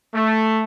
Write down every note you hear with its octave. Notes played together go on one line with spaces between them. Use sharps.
A3